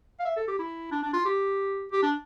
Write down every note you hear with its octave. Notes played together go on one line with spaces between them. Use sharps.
F5
E5
A4
G4
E4
D4
D4
F4
G4
G4
D4